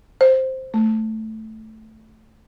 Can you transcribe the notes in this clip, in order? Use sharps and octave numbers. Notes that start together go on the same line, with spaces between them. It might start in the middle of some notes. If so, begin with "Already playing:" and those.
C5
A3